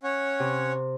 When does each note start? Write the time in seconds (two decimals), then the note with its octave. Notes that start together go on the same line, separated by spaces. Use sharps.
0.03 C#4 C#5 F#5
0.40 C3